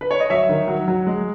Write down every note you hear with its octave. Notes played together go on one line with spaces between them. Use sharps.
B4
C#5
D#5
F#3 C#5 E5
D#3
F#3
F#3
G#3